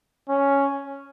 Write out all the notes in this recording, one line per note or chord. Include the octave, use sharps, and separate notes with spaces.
C#4